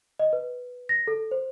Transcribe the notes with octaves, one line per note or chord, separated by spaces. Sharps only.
D#5
B4
A#6
A4
C5